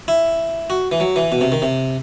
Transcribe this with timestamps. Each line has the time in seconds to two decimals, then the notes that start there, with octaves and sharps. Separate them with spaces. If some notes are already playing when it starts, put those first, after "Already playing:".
0.08 E4
0.70 F#4
0.92 E3
1.00 F#3
1.16 E3
1.32 B2
1.41 C3
1.52 D#3
1.62 C3